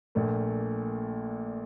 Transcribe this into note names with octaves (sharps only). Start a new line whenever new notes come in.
A#1 A#2 A3